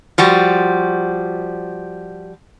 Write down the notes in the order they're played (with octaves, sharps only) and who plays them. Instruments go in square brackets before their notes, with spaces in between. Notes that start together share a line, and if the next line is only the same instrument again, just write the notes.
[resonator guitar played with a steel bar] F3 G3 F#4